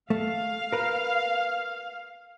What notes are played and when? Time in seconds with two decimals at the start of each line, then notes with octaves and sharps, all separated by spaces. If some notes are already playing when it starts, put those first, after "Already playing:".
0.10 A3 F5
0.73 A#4 B4